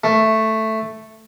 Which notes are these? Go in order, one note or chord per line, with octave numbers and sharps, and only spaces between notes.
A3